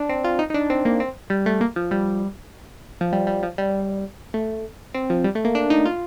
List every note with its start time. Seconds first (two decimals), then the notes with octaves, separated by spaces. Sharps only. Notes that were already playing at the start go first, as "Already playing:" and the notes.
Already playing: D4
0.09 C4
0.24 F4
0.39 D#4
0.50 D#4
0.54 D4
0.70 C4
0.85 A#3
1.00 C4
1.30 G3
1.46 A3
1.61 A#3
1.76 F3
1.91 G3
3.01 F3
3.12 G3
3.27 G3
3.43 F3
3.58 G3
4.34 A3
4.94 C4
5.10 F3
5.24 G3
5.35 A3
5.45 A#3
5.55 D4
5.70 D#4
5.85 F4